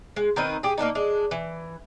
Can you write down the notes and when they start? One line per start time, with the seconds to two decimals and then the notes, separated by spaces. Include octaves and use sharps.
0.16 G#3
0.36 D#3 C4 B4 D#5
0.63 G4 G#4
0.78 A#3 B3 D4 D#4
0.95 G#3 D4
1.31 E3